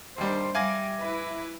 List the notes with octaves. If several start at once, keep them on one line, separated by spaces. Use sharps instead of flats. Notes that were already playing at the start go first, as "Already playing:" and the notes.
D#2 G3 D4 C5
G3 E5 F5 G#5 D6 A#6
E4 B4